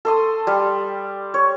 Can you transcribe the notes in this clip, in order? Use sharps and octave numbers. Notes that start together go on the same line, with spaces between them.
A4 C6 D#6
G3
C#5